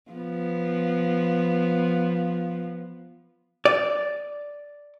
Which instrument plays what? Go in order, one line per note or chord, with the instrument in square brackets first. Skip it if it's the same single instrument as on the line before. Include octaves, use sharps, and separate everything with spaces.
[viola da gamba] F3 B3
[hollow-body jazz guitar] D5